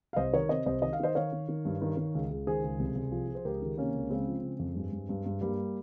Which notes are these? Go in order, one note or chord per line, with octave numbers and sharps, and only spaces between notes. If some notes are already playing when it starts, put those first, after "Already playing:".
F5
C2 C5 D#5
D#3 A#4 C#5
C3 C5 D#5
C2 C5 D#5
D#3 D#5
F5
D#3 C5 D#5
D#3 C#5 F5
D#3
D#3
G2
D#3
D#3
C#2
C#2
D#3 G#4 C5
C#2
C2
C2
F3
F3
C5
C#2 G4 A#4
D#3
C3 A#3 C#4
C#2
C#3 G#3 C4
F3
C#3
F2
G2
G2
G2
G2
G2 G3 A#3